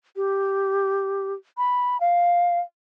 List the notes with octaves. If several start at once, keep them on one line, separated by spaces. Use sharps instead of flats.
G4
B5
F5